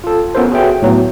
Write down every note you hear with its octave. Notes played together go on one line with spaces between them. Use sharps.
F4 A4
B3 C#4 F4 A4 A#4 C5
F#4 G#4 B4 C#5 E5 G5
A2 F#3 B3